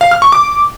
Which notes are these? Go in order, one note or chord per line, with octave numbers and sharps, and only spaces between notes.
F5
F6
C#6
D6